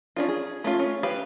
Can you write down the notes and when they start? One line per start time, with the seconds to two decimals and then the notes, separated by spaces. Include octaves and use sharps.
0.16 C#4 D4 F4
0.28 G#4
0.64 A3 C#4 F4
0.80 C#4
1.03 G4 B4 F5